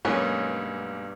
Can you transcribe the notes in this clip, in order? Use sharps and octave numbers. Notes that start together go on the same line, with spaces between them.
B1 G2 G#3 A#3 B3 C#4 C#5